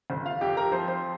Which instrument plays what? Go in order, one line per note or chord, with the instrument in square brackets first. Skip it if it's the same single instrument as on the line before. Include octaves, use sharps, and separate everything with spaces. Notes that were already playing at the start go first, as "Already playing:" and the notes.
[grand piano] G1 C5
F4 F5
F2 G4 G5
A#4 A#5
F3 C5 C6
C5 C6